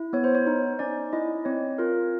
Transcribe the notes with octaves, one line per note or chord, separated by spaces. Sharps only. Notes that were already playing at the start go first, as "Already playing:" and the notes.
Already playing: E4
B3 C#5
C5
C#5
D#4
C#4 D5
E4 D#5
C4 C#5
F4 A#4